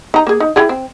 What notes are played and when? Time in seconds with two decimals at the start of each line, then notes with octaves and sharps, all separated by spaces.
0.14 D#4 A#5
0.27 A#3 G#4
0.40 D#4
0.56 E4 G4 G#4
0.69 C4